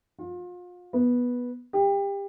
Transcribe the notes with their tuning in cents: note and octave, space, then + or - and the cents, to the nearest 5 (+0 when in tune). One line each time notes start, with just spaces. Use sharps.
F4 +35
B3 -10
G4 +25